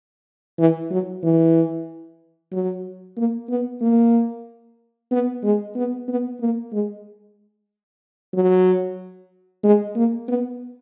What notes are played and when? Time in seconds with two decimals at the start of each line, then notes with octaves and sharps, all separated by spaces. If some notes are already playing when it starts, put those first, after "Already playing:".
0.59 E3
0.91 F#3
1.23 E3
2.53 F#3
3.17 A#3
3.50 B3
3.82 A#3
5.11 B3
5.44 G#3
5.76 B3
6.08 B3
6.41 A#3
6.73 G#3
8.35 F#3
9.64 G#3
9.96 A#3
10.29 B3